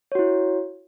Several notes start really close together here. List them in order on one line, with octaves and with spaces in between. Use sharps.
C#5 F#4 E4